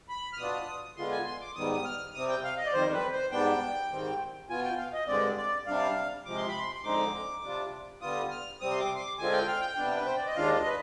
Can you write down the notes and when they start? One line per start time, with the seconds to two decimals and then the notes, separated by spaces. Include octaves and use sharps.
0.09 B5
0.33 F6
0.38 B2 B3 D4 F4 D#6
0.97 D3 G#3 B3 F4 C6
1.11 G#5
1.27 C6
1.41 D6
1.55 G#2 D#3 G3 B3 D#6
1.74 D#6
1.85 F6
2.14 C3 G3 C4 D#6
2.29 G5
2.44 F5
2.58 D#5
2.66 D5
2.73 F2 D#3 G3 C5
2.93 B4
3.12 C5
3.32 G#2 G3 B3 D4 G5
3.91 G#2 D#3 G3 C4
4.49 B2 B3 F4 G#5
4.64 G5
4.78 F5
4.93 D#5
5.07 G2 D3 G#3 C4 D5
5.37 D5
5.67 C3 G3 D4 F5
6.26 C3 F3 G#3 D6
6.37 C6
6.48 B5
6.59 C6
6.75 C6
6.84 F2 D3 G#3 C4 D#4 D6
7.43 C3 G3 D4 F4
8.01 D3 G3 B3 F4 D#6
8.31 F6
8.61 C3 G3 C4 D#6
8.71 C6
8.80 D6
8.96 C6
8.99 D6
9.19 D3 G#3 C4 F4 G#5
9.33 G5
9.47 F5
9.61 G5
9.77 C3 G3 B3 D4
9.97 B4
10.06 C5
10.16 D5
10.27 D#5
10.36 D#2 D#3 G#3 D4 F4 F5
10.56 D#5
10.66 B4